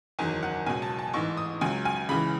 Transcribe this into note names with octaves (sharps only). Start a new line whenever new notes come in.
F#1 E2 D#3 F#3 G#5
F#5
C#2 B2 F#3 G#5
A5
A5
A1 G#2 E3 C#6
D#6
C#2 C#3 F#3 G#5
G#5
C#2 C#3 E3 B5